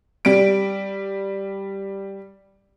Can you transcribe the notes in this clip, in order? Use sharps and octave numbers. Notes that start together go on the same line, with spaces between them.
G3 D7